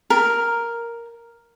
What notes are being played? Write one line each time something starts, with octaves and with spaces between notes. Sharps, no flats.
A#4